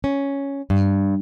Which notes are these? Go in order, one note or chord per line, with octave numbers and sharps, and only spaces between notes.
C#4
G2